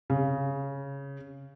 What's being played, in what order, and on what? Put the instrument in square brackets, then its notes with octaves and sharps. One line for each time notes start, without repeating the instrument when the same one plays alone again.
[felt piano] C#3